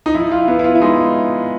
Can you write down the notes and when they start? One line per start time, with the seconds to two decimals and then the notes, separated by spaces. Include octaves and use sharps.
0.06 D#4
0.14 F3 E4
0.31 F4
0.48 B3 E4
0.59 E4
0.64 F4
0.75 E4
0.82 G#3 D#4